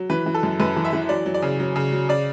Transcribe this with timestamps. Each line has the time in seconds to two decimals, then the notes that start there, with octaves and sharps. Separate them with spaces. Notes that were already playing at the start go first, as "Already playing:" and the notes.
Already playing: F#3
0.10 E3 B4
0.26 E3
0.34 A4
0.43 F#2
0.60 F#2 B4
0.76 E3
0.85 E5
0.93 E3
1.09 F#3 D5
1.26 F#3
1.34 D5
1.42 C#3
1.60 F#3
1.76 C#3
1.92 F#3
2.09 C#3 D5